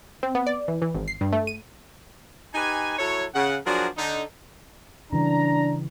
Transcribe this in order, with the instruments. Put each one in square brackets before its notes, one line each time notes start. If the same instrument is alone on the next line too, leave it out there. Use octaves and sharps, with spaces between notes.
[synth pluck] C4
B3
D5
E3
E3
G#1
C7
G2
A3
D#7
[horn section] D#4 G4 B4 G#5
F#3 E4 A4 C#5
C#3 F#5
F3 F#3 D4 F#4 G#4 A#4
D3 D#4
[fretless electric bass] C#3 E3 G3 [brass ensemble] D4 A#5